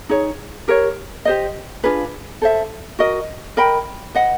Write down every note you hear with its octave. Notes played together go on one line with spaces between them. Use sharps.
D#4 G#4 C#5
G4 A#4 C#5
G4 C5 D#5
D4 F4 G#4 B4
A4 C5 E5
F#4 A#4 D#5
A#4 D#5 G5 B5
B4 D#5 F#5